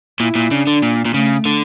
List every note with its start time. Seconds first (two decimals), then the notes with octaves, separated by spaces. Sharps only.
0.20 A#2 E4
0.35 A#2
0.51 C#3 D4
0.67 D3
0.82 A#2
1.05 A#2
1.14 C#3 A3
1.45 D3